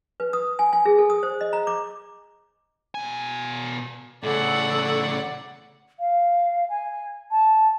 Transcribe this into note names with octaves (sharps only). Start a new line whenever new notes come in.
B4
D#6
G#5
G#5
G#4
A4
D#6
C5
D#5
A#5
D6
B2 G#5
A2 C#3 A4 D5 F#5
F5
G#5
A5